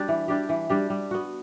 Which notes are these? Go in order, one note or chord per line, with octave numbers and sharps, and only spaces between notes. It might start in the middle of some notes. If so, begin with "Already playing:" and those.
Already playing: G3 D4 G4
E3
G3 D4 G4
E3
G3 D4 G4
G3
B3 F#4